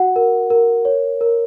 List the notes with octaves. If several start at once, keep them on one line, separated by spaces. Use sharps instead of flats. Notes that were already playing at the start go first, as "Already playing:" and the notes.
Already playing: F#4 F#5
A#4
A#4
C#5
A#4